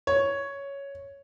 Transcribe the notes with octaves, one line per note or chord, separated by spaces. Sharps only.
C#5